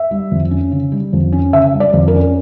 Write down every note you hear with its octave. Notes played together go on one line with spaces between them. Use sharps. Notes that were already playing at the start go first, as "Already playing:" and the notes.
Already playing: E5
G3
F2
C#4
C#3
G3
F2
C#4
C#3 E5
G3
D5
F2
A#4
C#4